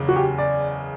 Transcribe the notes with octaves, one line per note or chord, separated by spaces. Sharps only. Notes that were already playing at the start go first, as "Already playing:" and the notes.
Already playing: F#1 E2 C#3
F#4
G4
D5